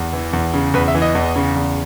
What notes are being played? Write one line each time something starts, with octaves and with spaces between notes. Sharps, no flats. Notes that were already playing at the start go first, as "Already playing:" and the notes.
Already playing: E2
E3
E2
C#3
E2 B4
E5
E3
D#5
E2
C#3
E2